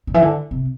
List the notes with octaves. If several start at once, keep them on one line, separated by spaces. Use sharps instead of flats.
D3
E3
D3
C3